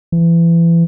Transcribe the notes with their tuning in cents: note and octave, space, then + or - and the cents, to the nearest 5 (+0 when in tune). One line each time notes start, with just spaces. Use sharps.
E3 +30